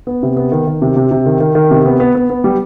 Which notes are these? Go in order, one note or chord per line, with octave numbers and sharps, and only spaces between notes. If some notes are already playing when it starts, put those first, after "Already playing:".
B3
C3
B3
D#3
D#3
C3
C3
C3
D#3
D#3
D#3
C3
B3
B3
B3
B3
G3